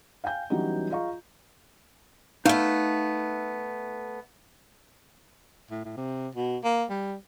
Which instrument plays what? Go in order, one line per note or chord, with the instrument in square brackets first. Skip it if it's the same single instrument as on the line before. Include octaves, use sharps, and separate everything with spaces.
[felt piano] F5 G5 G#5 G6
E3 F#3 G3 B3 C#4 D#4
F4 G#4 D#5 F5 A#5 C#6
[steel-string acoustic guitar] A3 B3 [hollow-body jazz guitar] D#4 F5
[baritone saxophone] A2
A2
C3
B2
A#3
G3